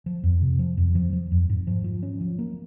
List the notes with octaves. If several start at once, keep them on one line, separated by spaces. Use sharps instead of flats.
F3
F2
C3
F3
F2
F3
F3
F2
G#2
F3
F3
C#4
F3
A#3